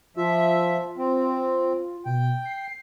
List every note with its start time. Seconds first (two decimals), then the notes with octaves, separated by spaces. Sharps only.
0.16 F3 F4 E5
0.97 C4
2.06 B2 G5
2.45 C7